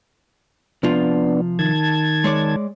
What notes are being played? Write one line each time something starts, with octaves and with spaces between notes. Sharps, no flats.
C3 F3 B3 D4 F4
D#3 A5 G#6
G#3 C#5 D5